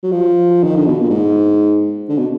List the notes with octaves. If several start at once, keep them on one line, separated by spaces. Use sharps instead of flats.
F#3
F3
D#3
D3
B2
A#2
G#2
D3
B2